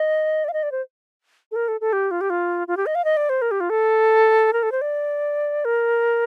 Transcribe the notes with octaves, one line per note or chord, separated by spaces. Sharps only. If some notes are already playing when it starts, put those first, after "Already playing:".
Already playing: D#5
D5
F5
D#5
D5
C5
A4
A#4
A4
A4
G4
F4
G4
F4
F4
G4
D#5
F5
D#5
D5
C5
A#4
G4
F4
A4
A#4
A4
C5
D5
A#4